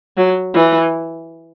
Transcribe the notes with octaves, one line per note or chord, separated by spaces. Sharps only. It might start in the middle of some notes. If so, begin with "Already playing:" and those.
F#3
E3